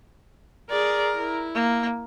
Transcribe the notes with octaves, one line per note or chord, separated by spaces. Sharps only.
G#4 A#4 D5
E4
A#3